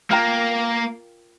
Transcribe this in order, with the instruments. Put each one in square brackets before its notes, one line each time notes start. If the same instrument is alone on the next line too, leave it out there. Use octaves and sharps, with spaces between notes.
[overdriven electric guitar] A#3 [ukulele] F4 A#4 G5 A#5